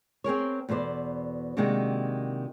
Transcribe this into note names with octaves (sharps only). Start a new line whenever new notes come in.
C4 G#4 A#4 C#5
E2 B2 A4 C5 D5
C3 D#3 G#3 A#3 D4 F#4